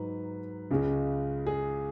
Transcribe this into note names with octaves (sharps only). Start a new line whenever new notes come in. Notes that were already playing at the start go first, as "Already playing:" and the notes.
Already playing: G#2 F#3 D#4 B4
C#2 C#3 G#3
G#4